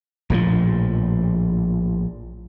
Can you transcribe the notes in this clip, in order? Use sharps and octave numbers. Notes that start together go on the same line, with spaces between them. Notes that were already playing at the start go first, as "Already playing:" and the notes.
A#1 A2 C#3 F3